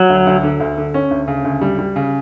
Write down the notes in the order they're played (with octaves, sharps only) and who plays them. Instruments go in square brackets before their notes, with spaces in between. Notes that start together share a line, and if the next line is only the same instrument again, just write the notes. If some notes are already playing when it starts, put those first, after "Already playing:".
Already playing: [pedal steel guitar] F#3
[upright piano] D2
D2
D3
D2
D3
C#4
D2
C#3
D2
G3
G3
C#3